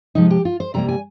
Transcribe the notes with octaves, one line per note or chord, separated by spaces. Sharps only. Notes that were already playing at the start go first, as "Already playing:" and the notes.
C3 F3 G#3 D#4
G4
F4
C5
C3 G3 A#3 A#5
G#5